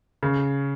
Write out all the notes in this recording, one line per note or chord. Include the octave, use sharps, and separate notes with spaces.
C#3